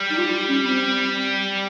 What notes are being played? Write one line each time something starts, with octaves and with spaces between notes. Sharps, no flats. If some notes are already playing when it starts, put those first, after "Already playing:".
Already playing: G3
D#4
F4
C#4
C4